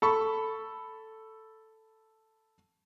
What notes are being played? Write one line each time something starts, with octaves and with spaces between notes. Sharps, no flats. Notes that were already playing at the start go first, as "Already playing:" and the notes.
A4 B5 C#6